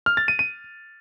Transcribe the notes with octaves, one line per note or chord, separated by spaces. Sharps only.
F6
A6
D#7
D#7